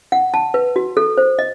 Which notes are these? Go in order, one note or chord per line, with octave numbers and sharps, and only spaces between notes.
F#5
A5
B4
F#4
A4
C5
D#5